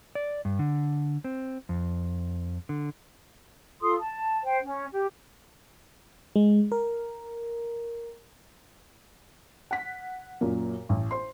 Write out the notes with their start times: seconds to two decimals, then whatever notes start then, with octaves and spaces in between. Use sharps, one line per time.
0.15 D5
0.45 G2
0.59 D3
1.24 C4
1.69 F2
2.69 D3
3.81 F4 A4 C6 D#6
3.99 A5
4.44 C5 G5
4.63 C#4
4.92 G4
6.36 G#3
6.72 A#4
9.71 F#5 B6
10.41 F#2 A#2
10.89 A1
11.11 C5 C6